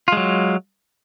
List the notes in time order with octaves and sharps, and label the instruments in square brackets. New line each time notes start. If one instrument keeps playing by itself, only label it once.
[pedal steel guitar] F4
G#3
F#3